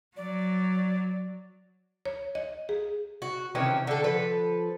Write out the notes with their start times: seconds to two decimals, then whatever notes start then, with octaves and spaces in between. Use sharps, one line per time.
0.17 F#3 D5
2.05 C#5
2.35 D#5
2.69 G#4
3.22 F#4
3.55 C3 D#3 E3 C#4
3.87 D3 A4
4.04 F3 A4 B4